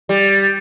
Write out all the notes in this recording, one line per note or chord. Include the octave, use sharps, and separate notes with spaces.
G3